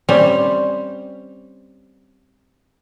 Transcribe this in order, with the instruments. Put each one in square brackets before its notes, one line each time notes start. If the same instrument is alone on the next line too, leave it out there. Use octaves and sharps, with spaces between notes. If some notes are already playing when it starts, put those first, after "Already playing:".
[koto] G3 C4 C#4